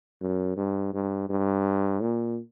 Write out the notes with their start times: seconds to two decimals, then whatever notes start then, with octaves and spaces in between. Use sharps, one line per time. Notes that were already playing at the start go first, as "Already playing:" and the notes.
0.21 F#2
0.57 G2
0.94 G2
1.30 G2
2.01 A#2